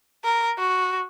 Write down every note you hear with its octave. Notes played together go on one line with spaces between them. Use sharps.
A#4
F#4